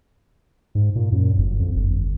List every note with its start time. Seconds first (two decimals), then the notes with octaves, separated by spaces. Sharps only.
0.75 G#2
0.95 A#2
1.12 F#2
1.38 G1
1.59 F2
1.76 G1